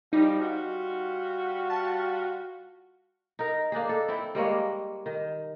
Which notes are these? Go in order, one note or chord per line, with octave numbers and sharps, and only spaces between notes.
F3 G3 D#4
G3 F4 F#4
A5
D#4 A#4
A#3 D4 D#4 G#4
A4
C4 E4
G3 G#3 A#3 C#5
D#3